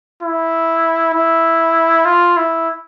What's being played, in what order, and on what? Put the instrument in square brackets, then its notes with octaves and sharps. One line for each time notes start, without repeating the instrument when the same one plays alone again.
[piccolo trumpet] E4
E4
F4
E4